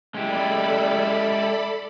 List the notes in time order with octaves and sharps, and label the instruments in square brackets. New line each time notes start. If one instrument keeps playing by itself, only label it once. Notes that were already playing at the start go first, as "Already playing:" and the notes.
[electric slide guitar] G#3 G4 [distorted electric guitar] C#4 E4 [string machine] A4 D5 B5